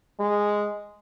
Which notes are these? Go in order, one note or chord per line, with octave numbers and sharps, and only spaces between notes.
G#3